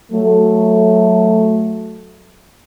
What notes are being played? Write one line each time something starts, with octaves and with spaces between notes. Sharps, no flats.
F#3 A3